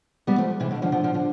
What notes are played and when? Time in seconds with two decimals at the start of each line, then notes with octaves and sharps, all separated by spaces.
0.27 G3 B3
0.38 F3 A3
0.60 C3 E3
0.71 B2 D3
0.82 D3 F3
0.92 D3 F3
1.04 D3 F3
1.14 D3 F3